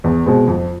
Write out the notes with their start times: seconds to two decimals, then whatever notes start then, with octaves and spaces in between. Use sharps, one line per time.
0.04 E2
0.26 B2 G#3 C4
0.47 F2